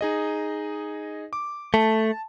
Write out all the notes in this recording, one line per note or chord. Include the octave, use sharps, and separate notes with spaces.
D#4 G#4 D#5
D6
A3 A5